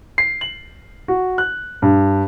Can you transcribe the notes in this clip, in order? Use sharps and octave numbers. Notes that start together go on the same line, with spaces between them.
C7
F#7
F#4
F#6
G2